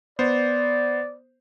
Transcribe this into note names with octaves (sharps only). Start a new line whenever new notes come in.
B3 C5 D5